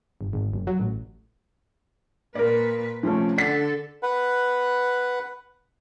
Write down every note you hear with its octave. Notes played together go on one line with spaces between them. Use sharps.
G1
G#1
F#1
F#3
A1
A#2 A#4 B4 D5
C3 F3 A3 C#4
D3 A4 D5 F#5 B6
B4 F#5